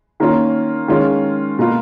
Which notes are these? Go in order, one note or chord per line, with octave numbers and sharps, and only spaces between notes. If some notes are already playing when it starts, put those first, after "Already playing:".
D#3 A#3 C#4 F4
D#3 G#3 C#4 F4
B2 A#3 F4